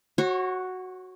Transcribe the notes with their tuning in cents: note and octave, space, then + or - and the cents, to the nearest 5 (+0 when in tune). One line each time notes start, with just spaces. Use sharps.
F#4 +0 C#5 -35